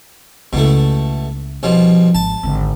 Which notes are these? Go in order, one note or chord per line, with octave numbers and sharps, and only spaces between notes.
C#2 B2 A3 E4
C2 B2 F3
G#1 A5
G#1 D3